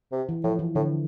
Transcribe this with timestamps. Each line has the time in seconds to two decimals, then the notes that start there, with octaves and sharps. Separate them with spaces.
0.12 C3
0.29 E3
0.44 A2 F3
0.59 E3
0.75 A2 D3